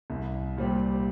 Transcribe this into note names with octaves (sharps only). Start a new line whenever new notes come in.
C2
A#2 G3 C4 G4